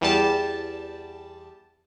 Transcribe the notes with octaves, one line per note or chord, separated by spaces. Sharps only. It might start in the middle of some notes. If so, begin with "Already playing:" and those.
E2 G3 A5